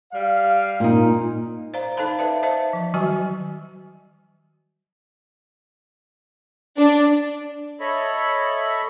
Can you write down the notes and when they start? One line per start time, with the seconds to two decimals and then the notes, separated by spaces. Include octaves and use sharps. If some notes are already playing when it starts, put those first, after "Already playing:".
0.13 G3 F5
0.80 A#2 D#4
1.74 C5 D5 F5 A#5
1.97 D#4 A4 C5 F5 A5 B5
2.19 B4 D5 E5 F5 A5
2.43 C5 D#5 E5 A5
2.73 F3
2.94 D#3 F#3 G3 F#4 G#5
6.78 D4
7.80 A4 C#5 D#5 E5 B5